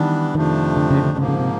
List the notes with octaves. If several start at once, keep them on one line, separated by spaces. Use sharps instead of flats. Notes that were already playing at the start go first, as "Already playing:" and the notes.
Already playing: D#3 E3 G3 B3 D4
F2 C3 D#3 F3 A3 D4
D3
C#3
D3
G#2 C#3 F3 A#3
C#3
C3